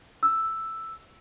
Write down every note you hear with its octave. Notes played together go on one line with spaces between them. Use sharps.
E6